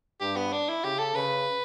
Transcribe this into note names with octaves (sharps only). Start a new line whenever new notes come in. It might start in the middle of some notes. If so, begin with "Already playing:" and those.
G2 G4
B3
D4
E4
C#3 G4
A4
C#3 B4